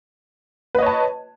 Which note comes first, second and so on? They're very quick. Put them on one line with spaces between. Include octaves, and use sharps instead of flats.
B4 D#5 C#5 A5